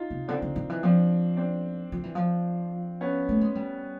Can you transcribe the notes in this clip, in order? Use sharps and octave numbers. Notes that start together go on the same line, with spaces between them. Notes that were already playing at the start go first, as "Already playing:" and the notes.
Already playing: D#4 F4
C3
D3 C4 D4
D3
D#3
E3
F3 C4 D4
C4 D4
F3
E3
F3
B3 C#4
A3
G#3
G3